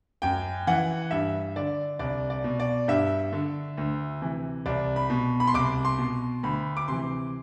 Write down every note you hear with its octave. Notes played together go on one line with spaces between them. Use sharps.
F#2 G5
E3 F#5
G2 E5
D3 D5
C2 D5
D5
B2
D5
G2 E5
D3
D2
C3 E3
C2 D5
B5
B2
B5
C6
C2 D6
C6
B2
D2 B5
D6
C3 E3 C6